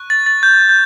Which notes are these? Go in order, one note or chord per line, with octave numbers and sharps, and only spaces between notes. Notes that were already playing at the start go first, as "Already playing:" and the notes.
Already playing: C#6 F#6
A6
A6
G6
G6